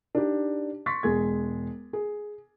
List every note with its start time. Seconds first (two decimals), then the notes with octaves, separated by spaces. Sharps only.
0.15 D4 D#4 G4
0.86 C6 C#6 A6 B6
1.03 E1 G#3 G#4 G#6
1.93 G#4